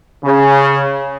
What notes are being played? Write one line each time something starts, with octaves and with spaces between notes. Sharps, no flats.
C#3